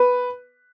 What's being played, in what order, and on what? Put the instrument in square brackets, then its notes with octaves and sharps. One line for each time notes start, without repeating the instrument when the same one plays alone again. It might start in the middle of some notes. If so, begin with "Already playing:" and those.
Already playing: [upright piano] B4